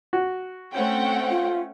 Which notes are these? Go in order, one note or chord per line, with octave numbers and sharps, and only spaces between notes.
F#4
A3 C4 C#4 F#5 G5
F4